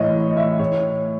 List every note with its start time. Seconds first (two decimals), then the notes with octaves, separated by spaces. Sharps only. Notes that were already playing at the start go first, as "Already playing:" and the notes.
Already playing: A2 E3 C#5 D#5
0.31 D#5
0.37 E5
0.59 A2 C#5